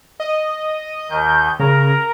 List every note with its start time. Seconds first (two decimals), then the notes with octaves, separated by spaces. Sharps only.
0.20 D#5
1.10 D#2 D#3 G6
1.59 C#3 A#4 A#5